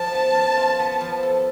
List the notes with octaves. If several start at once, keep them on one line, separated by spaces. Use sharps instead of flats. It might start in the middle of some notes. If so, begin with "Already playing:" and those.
Already playing: F3 A5
B3
F3
F4
B3
F3
A4